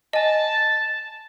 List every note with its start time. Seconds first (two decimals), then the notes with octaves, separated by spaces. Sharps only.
0.13 D#5 G#5 A5